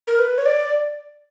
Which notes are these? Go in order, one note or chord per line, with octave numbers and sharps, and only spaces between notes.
A#4
B4
C#5
D5